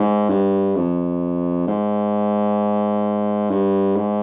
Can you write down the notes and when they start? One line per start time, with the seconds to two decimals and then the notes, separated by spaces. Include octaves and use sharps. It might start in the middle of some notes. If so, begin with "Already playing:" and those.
Already playing: G#2
0.29 G2
0.75 F2
1.67 G#2
3.50 G2
3.96 G#2